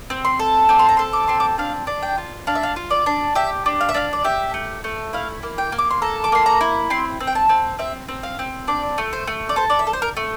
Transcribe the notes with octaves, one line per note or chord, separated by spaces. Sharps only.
C4
C6
A4
C4 D6
C6
A#5
A4 C6
D6
C4 C6
D6
D4 F5
D4
G5
F4
D4 F5
E5
F5
F4
D5
D4
G4 E5
D4
F5
E5
D4 F5
D5
G4 E5
A3
A3
E4 F5
A#3
G5
A#3
D6
C6
A4 A#5
D6
A#3 C6
A#5
E4
C4 C6
C4
G5
A5
C4
C4 E5
C4
F5
C4
D4 D5
A3
C5
A3
D5
A4 C5
D5
E5
A4
C5
A#4
A3